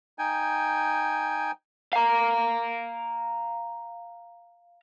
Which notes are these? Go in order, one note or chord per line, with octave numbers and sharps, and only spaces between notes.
D#4 G5 G#5
F5 A#5